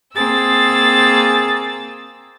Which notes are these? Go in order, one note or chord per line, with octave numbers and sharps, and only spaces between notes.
A#3 C4 G#4 E6 A6